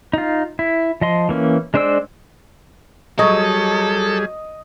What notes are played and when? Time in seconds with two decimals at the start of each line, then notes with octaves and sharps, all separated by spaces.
0.13 D#4 F4
0.59 E4
1.01 F3 D#5 C6
1.29 E3 A#3 C#4
1.74 G#3 D4 C5 D5 E6
3.19 F#3 G3 G#4 A4 D#5